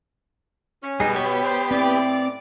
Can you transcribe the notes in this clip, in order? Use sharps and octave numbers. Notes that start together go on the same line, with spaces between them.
C#4
B2 G3 D#4 G#4
B3 G4 C#5 C#6
C5 D5
A2 E3 C4 D5